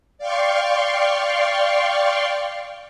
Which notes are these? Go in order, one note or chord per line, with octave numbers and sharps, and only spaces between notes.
D5 F5 G5 C6 C#6